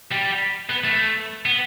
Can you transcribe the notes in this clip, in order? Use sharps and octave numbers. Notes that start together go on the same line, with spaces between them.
G3
B3
A3
B3